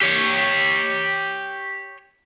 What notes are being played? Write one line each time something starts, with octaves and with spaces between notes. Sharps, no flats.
G4 C#5